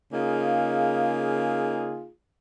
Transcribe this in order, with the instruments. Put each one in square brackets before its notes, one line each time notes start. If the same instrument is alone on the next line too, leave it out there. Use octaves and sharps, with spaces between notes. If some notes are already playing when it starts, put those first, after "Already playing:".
[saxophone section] C#3 A#3 D#4 F4 G#4